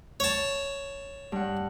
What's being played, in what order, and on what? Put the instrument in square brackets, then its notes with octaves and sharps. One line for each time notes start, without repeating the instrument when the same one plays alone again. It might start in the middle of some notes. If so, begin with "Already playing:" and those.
[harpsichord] C#5 A5
[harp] G2 F#5